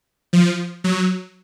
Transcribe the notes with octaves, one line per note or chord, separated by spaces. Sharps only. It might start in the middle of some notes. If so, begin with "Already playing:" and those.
F3
F#3